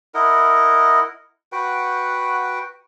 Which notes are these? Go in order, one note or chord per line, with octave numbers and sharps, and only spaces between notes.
E4 A#4 D#5 F#5
F#4 B4 F#5 G5